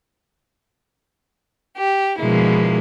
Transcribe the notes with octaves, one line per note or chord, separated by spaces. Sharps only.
G4
B2 D3 F3 G#3 A#3 E4